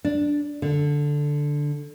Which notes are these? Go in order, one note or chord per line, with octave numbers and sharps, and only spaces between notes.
D4
D3